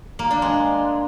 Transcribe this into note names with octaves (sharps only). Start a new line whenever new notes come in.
A#3
D4
G#3